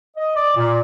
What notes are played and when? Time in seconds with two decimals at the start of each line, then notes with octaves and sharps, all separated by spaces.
0.16 D#5
0.35 D5
0.55 A#2